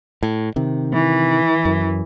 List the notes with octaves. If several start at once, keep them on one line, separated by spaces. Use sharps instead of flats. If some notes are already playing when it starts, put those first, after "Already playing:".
A2
C3 D#3
E3
F#2